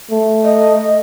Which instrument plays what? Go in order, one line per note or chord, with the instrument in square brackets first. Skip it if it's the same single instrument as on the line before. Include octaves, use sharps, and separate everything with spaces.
[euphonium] A3
[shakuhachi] D#5